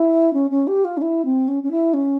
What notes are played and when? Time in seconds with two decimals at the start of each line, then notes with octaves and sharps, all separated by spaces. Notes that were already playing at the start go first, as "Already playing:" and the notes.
Already playing: E4
0.33 C#4
0.50 C#4
0.67 G4
0.84 F4
0.97 C#4
1.01 E4
1.24 C4
1.48 C#4
1.63 C#4
1.71 E4
1.93 C#4